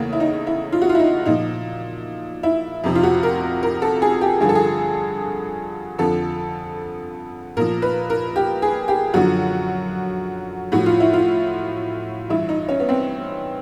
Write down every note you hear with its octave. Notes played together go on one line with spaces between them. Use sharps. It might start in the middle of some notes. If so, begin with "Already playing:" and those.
Already playing: E2 C#3 E3 A3 A#3
E4
D#4
E4
F4
F#4
F4
E4
D#4
A#2 F3 D#4
E4
F2 C3 F3
F4
F#4
A#4
A#4
A4
G#4
G4
G2 D3 F3 G#4
A4
G#4
F2 D3 F3 A4
A#2 F3 A#4
B4
A#4
G4
G#4
G4
F#2 D3 F3 F#4
A2 F3 F#4
F4
E4
F4
G2 E3 E4
D#4
C#4
B3
C4